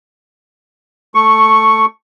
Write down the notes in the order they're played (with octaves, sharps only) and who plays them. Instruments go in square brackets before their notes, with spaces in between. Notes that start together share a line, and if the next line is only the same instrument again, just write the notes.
[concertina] A3 C#6